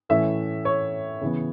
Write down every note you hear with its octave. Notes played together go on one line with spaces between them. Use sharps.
A2 E3 A3 C#4 E5
C#5
C#3 E3 B3